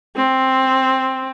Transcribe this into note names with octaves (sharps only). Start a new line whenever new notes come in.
C4